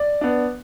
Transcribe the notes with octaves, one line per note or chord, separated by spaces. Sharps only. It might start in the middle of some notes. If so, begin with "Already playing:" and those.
Already playing: D5
B3 D4